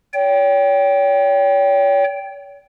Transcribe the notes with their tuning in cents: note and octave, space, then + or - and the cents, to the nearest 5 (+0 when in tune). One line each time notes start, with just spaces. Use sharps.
C#5 +40 G5 +0